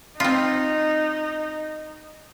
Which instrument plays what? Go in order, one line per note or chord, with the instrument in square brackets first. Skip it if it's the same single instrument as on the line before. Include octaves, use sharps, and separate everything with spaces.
[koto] C4 F4 [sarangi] D#4